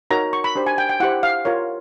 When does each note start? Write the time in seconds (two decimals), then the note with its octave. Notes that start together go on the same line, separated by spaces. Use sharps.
0.11 D#4 F#4 A#4 C#5 A#5
0.33 C#6
0.44 B5
0.55 D4 G4 C5
0.66 G#5
0.78 G5
0.89 G5
1.00 E4 G4 C5 F#5
1.23 F5
1.45 F4 A#4 C#5